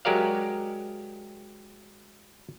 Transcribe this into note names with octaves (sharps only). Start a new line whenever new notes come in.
F#3 G#3 G4 A#4 D5 F5